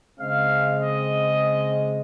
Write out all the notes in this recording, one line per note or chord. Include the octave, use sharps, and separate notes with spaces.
C#3 G#3 C4 F5
D#5